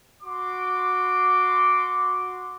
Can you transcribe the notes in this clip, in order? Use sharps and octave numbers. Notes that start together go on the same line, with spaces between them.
F#4 C6 D6